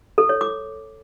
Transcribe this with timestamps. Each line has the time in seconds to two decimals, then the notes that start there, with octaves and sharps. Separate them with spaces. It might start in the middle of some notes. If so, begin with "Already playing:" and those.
0.18 A4
0.29 C#5
0.41 D6